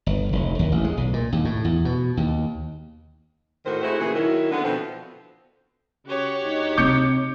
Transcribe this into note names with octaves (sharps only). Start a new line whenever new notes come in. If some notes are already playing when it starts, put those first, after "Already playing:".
G1
F1
D#2
A1
G#3
B1
A#2
D#2
A2
E2
B2
D#2
A2 D#3 F#4 C5
G#3 A3 C4 E4 F#4 C5
A#2 C#3 E3 F3 F#4 G#4
D#3 F#3 E4
D3 B3
B2 F3 C4 A4
C#3 F#4 G4 C#5
D2 D#4
C3 C4 D6 G6 C#7